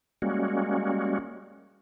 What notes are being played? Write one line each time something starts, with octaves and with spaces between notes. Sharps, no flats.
G3 G#3 A#3 C#4 F#4